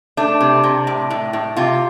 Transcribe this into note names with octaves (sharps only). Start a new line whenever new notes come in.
A3 D4
C3
C3
A2
A2
A2
C3 F4